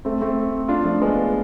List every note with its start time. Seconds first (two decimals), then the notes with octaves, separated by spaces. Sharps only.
0.05 A3 C4
0.22 A3 C4
0.68 D4 F4
0.84 F3 A3
1.02 G#3 B3